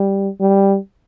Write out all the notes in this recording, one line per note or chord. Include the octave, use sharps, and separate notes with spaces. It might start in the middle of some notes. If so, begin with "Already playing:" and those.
Already playing: G3
G3